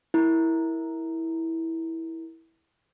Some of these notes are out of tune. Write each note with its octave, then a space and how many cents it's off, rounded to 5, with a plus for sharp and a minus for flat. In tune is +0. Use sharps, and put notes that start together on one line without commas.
E4 -10 A#4 +0